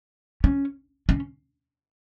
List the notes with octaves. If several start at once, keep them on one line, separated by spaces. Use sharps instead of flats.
C#4
C#4